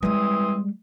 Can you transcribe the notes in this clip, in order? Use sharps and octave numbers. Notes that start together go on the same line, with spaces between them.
E3 G3 G#3 C4 D#6